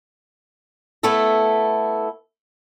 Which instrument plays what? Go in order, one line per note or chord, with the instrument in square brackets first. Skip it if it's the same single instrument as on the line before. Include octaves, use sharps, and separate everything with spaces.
[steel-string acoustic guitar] A3 B3 E4 A4